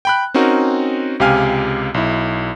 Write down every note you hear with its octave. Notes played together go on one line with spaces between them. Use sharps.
G5 B5 F#6
C4 C#4 D#4 F#4 A#4
C#2 C3 G4 F5 G#5 F6
B1 E4